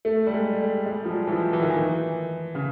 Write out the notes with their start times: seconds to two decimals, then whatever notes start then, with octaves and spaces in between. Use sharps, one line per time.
0.05 A3
0.27 G3
0.34 G#3
0.61 G3
0.86 G#3
0.90 G3
1.05 F3
1.11 F#3
1.27 E3
1.32 F3
1.53 E3
1.62 D#3
1.70 E3
2.55 C#3